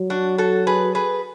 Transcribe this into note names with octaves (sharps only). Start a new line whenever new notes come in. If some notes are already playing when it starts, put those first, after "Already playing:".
Already playing: F#3
D4 F#4
F#4 A4
G#4 B4
G#4 B4